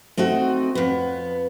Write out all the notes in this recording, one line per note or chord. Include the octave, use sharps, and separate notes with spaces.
A3 C4 D#4 F#4
F2 B3